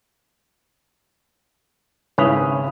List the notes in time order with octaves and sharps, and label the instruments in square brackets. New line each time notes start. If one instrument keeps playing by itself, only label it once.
[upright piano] G#1 E4 D#6 [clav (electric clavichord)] C#3 C#4 B4